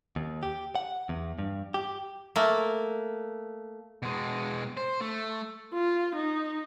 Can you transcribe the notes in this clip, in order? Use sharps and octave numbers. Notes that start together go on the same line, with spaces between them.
D#2
G4
F#5
E2
G2
G4
A3 A#3
B2 G#3
C5
A3
F4
D#4